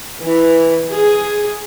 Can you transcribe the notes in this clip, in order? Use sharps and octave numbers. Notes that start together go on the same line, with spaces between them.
E3
G#4